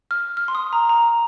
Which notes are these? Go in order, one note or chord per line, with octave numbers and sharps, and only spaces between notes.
F6
F6
C6
D#6
A#5
A#5